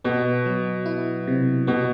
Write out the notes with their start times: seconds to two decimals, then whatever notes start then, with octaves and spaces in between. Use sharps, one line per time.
0.04 B2 B3
0.46 F#3
0.86 E4
1.27 C3
1.67 B2 B3